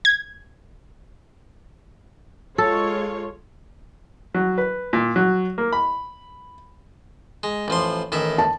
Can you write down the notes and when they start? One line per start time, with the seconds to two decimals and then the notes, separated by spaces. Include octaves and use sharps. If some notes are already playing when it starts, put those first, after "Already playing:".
0.05 G#6
2.58 G#3 F4 A4 C#5
4.34 F#3
4.58 B4
4.93 A#2
5.16 F#3
5.58 A#3
5.73 B5
7.43 G#3
7.68 A1 F3 C6
8.12 A1 D#3 E5
8.38 A5